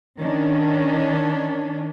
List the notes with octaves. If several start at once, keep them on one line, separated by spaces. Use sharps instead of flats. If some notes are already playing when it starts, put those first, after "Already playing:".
D#3 C#4 D4